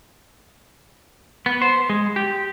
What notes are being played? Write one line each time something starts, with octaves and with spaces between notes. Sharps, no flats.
B3
C5
G#3
G4